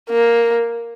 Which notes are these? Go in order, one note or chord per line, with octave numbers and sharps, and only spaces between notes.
A#3